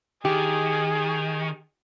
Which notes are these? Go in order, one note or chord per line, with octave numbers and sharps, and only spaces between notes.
D#3 G4 G#4